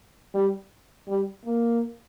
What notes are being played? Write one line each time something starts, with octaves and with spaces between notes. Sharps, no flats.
G3
G3
A#3